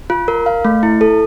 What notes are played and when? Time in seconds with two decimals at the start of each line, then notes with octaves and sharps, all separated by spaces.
0.10 F4
0.28 A#4
0.46 F5
0.65 A3
0.83 E4
1.01 A4